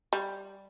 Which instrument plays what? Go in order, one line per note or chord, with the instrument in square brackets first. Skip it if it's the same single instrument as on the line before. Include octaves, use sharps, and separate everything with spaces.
[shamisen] G3